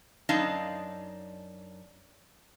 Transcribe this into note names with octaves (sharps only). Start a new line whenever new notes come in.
F#2 D4 D#4 D#5 F5 A5